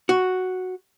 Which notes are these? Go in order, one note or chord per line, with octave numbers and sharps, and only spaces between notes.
F#4